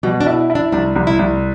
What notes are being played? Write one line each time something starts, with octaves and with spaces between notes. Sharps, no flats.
B2 G3
D4
E4
E4
D4
C2 D4
C2
E4
C2